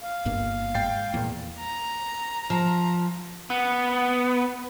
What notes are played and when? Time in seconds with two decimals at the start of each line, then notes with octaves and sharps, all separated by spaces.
0.01 F5
0.25 G1 G2 A#3
0.75 G#2 G5 A6 C7
1.14 E2 A#2 A#3
1.60 A#5
2.50 F3
3.50 B3